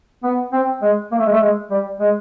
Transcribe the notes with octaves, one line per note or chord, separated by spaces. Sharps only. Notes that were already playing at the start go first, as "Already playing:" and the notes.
B3
C4
G#3
A#3
A3
G#3
A3
G#3
G3
G#3